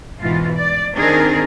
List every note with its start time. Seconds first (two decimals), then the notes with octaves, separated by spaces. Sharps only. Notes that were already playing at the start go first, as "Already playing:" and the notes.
0.20 G#2 B2 E3 F4
0.56 D5
0.93 D#3 C4 D4 D#4 G#4 A#4